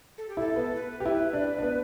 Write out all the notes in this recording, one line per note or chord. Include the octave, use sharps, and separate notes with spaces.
A4
G4
E4 A4
B3
B4
G4
E4
D4
D4
B3